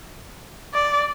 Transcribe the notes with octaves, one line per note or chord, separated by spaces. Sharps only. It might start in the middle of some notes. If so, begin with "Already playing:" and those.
D5